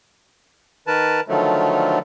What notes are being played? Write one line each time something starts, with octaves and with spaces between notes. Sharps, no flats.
D#3 A#4 B4 A5
D3 D#3 F3 F#3 A3